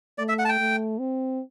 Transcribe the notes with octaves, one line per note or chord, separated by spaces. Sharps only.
A3 D5
E5
F#5
A5
G5
A3
C4